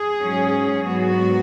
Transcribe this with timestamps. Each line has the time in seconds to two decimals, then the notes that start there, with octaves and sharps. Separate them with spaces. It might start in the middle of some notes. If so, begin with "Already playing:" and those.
Already playing: G#4
0.19 G#2 F#3 C#4
0.85 G#2 F#3 B3 F#4